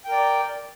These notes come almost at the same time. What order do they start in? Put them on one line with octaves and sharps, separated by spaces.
G5 A#4 D5